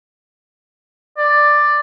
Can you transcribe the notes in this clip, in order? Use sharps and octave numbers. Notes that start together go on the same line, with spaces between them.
D5